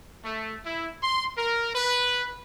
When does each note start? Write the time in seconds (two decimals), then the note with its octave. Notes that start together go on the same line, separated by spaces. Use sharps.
0.25 A3
0.64 E4
1.02 C6
1.36 A#4
1.75 B4